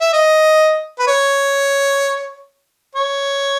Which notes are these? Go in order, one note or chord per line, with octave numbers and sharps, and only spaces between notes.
E5
D#5
B4
C#5
C#5